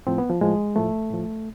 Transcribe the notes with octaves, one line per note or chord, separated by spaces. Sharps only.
A2 F3 C4
B3
F3
A2 F3 G#3
A2 F3 A3
A2 F3